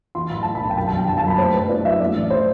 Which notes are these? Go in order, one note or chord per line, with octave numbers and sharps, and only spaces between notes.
E3 C6
A2 B5
A2 A5
B5
B1
G5
F#2 A5
A5
G1
G5
G1 A5
A5
F#2 B5
A3 C5
G2 B4
E4 D5
F#3 E5
A3 D5
A1
C5